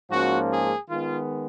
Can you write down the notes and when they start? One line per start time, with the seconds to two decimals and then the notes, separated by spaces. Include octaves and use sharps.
0.10 G#2 F3 A#3 C#4 F#4
0.50 G#4
0.89 D#3 G#3 B3 F4